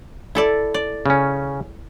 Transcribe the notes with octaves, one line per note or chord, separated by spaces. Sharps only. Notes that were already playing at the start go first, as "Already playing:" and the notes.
E4 A4 D5
D5
C#3 C#4